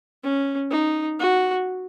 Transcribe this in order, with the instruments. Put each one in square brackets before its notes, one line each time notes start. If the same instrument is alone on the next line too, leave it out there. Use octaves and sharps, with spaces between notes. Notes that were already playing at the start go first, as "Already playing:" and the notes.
[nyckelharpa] C#4
D#4
F#4